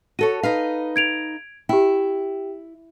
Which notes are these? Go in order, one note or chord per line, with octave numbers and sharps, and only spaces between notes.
F#4 A4 C#5 D#7
D#4 B4 F5
G#6 D7 F7
E4 G4 G5